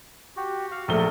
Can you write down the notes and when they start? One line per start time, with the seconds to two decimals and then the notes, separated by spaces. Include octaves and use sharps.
0.37 F#4 G4
0.71 F#4 F5
0.88 A#1 A3 A#4 G7